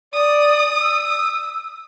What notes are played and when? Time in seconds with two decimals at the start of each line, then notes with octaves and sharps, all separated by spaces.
0.13 D5 D#6
0.80 E6